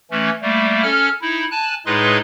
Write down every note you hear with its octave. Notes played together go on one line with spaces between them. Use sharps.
E3 A3 C#4
G3 A3 A#3
C#4 A4 F6
D#4 E4
G#5 A5 F#6
A2 G#3 D#4 G#4 B4 C6